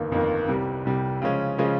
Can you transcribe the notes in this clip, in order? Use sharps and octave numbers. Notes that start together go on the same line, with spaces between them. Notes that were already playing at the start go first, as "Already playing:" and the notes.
Already playing: G1 F2 D#3 A#3
G1 F2 D#3 A#3
C2 C3 G3
C2 C3 G3
C#3 F3 G#3 C#4
C#3 F3 G#3 C#4